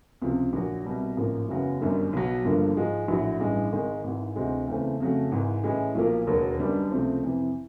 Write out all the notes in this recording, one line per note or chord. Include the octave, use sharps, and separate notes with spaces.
C#2 C3 F3
A#1 A#2 F#3
C2 B2 G3
A1 G#2 F3 A#3
F#1 E2 C#3 F#3 B3
G1 F#2 D#3 G3
B1 B2 F#3
G1 G2 D3 F3 A#3
G#2 F3 G#3
A#1 A2 F#3
A1 G2 E3 G#3
G#1 G#2 D#3 G#3
G#1 G#2 E3
D2 C3 E3 G#3 C4
E2 C#3 E3 A3 C4
F2 C#3 F#3 A3
G#1 G#2 E3
A2 E3 G#3 C#4
B1 A#2 F3 A#3
E1 D#2 D#3 F#3 B3
F#2 D#3 G3 B3 D4
C#2 C3 F3 A3 C4
F2 C3 E3